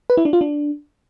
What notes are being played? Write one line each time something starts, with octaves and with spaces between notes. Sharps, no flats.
B4
E4
D4
F4
D4